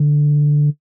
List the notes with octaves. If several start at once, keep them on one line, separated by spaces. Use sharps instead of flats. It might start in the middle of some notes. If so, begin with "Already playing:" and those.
Already playing: D3